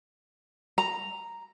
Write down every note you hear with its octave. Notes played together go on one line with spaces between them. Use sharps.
A#5